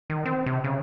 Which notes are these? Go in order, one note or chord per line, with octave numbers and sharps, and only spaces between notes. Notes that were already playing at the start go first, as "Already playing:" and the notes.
D#3
C4
C3
C#3